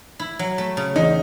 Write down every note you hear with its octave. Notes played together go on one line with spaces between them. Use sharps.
E4
F#3
A3
C#3
E2 D#4